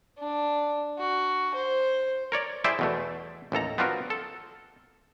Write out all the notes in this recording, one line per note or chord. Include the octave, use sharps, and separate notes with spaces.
D4
F#4
C5
A#4 C#5 D5
E4 G4 G#4 C5 D5 E5
E2 B2 A3
A1 D#2 A4 A#5
B3 C4 D4 F4 F#4 A#4
A4